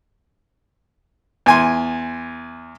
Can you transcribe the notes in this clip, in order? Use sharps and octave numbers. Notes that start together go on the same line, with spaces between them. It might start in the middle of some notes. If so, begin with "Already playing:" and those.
E2 G#5 C6